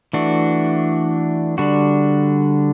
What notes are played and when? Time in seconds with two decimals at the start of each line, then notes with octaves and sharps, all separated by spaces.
0.13 E3 A3 D4 F#4
1.58 D3 G3 D4 F#4